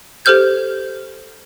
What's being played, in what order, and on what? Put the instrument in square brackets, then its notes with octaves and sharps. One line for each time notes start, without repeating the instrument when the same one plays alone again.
[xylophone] G4 A4 C5 F6 G6 G#6